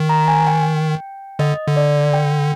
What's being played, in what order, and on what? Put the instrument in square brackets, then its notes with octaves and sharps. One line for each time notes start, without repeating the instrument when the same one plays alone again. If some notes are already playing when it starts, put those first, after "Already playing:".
Already playing: [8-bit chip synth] D#3
[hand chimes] A#5
G#5
G5
[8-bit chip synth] D3 [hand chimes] D#5
[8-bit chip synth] D3
[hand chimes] D5
G5